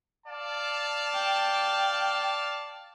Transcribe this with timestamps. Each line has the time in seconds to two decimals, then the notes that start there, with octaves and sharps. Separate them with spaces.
0.27 D5 F5 A5
1.14 G5